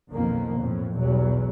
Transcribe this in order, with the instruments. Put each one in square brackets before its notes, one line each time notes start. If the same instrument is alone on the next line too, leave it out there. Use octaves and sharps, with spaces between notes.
[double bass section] B1 F2 D#3 A#3
F2 A2
B1 E2 F#3 G3